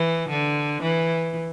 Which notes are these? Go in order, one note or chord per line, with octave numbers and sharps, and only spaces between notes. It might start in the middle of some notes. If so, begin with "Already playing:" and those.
Already playing: E3
D3
E3